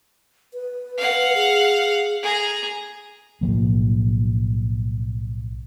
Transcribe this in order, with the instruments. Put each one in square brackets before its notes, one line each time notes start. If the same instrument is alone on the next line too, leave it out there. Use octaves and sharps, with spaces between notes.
[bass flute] B4
[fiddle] F5 F#5
[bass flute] G#4
[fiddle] G#4 A#5
[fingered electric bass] B1 A2 F3 A#3